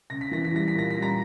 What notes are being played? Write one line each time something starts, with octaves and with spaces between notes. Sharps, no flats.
C#3 A#6
B6
E3 A#6
B6
G3 A#6
B6
A#2 A#6
B6
G3
A#5 A#6